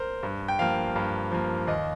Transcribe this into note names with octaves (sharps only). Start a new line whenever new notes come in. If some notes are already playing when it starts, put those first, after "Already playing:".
Already playing: A#4 C5
G2
G5
F3 A#3 F5
G2
F3 A#3
D#2 D#5